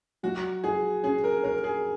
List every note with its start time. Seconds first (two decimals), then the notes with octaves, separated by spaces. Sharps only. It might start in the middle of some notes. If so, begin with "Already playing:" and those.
0.23 F#3 F#4
0.64 F#4 G#4
1.03 C#4 G#4
1.24 A#4
1.43 A#4 C#5
1.64 G#4